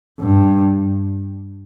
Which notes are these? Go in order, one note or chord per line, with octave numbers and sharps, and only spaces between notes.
G2